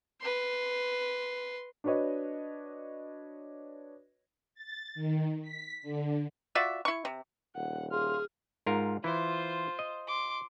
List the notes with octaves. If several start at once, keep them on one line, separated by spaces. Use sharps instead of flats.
B4 C6
D4 F#4 B4 C#5 D#5
A6
D#3
B6
D3
F4 F#4 D5 E5
E4 C#6
C3
D#1 F#5
F4 G#4 F6
G#2 F4 A#4
E3 E4 F4 C5
D#5
C6 D6